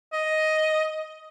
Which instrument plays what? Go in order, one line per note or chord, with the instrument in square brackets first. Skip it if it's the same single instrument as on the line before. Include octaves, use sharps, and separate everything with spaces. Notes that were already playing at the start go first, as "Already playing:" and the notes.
[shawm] D#5